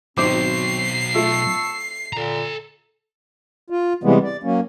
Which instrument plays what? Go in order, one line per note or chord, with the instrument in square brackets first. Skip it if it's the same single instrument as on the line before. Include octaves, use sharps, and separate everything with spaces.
[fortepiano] G#1 C5 D6 [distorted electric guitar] B2 F#3 [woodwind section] C4 F#4 [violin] C7
[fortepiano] A3 F4 [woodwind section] A5 C#6 E6
[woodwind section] A#2 D3 [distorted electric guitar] A4 A#5
[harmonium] F4
C3 E3 G3 G#3 B3
D5
F#3 A#3 C#4